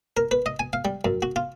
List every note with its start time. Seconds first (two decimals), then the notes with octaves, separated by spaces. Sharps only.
0.17 A#4
0.31 B4
0.46 D#5
0.59 G#5
0.73 F5
0.85 G3
1.05 F#2
1.22 F#4
1.36 F4